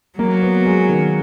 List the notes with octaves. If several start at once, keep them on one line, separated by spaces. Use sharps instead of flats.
F#3 A#3
B3
G#3
D#3